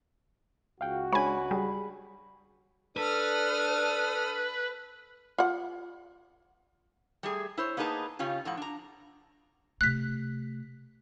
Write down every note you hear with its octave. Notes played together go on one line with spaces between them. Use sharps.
C#2 F#4 F5 G5
G#3 D4 C#5 G#5 B5
G3 G#4
D4 A4 B4 D#6 F6
F4 F#5
G3 A3 G#4
E4 C5 C#5
A#3 B3 D#4 G#4 B4 A5
C#3 C#4 F4 G4
A2 F3 F#5
D4 A#5
C3 A3 F#6 B6